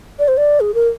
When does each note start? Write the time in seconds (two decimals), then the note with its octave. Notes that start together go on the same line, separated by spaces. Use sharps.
0.19 D5
0.28 C5
0.37 D5
0.60 G#4
0.75 A#4